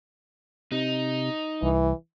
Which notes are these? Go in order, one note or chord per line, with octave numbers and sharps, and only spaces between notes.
C3 D#4
C2 E3